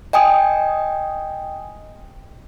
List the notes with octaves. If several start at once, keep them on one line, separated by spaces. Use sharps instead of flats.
D#5 G5 G#5 D#6